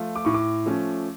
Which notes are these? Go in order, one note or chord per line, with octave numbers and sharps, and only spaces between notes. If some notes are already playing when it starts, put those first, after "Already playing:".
Already playing: F3 A3 F4
D6
A2 C#6
D6
F3 A3 C#4